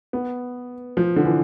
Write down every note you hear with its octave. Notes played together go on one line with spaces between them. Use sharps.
B3
F3
D3
E3